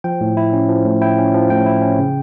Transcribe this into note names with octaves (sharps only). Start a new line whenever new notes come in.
F3 G5
A2
E4
C#4
F3
A2
E4 G5
C#4
F3
A2 G5
E4
C#4
C#3